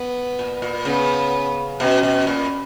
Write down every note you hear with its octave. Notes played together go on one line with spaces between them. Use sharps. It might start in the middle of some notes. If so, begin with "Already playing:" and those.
Already playing: B3
A#2
A#2
C#3 B3
B2 C#4
B2
A#2